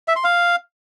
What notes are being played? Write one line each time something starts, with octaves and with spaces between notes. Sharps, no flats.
E5
C6
F5